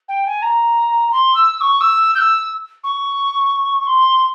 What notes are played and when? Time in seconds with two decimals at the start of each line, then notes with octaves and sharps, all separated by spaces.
0.08 G5
0.26 G#5
0.42 A#5
1.12 C6
1.35 E6
1.57 E6
1.61 C#6
1.81 E6
2.15 G6
2.18 E6
2.84 C#6
3.86 C6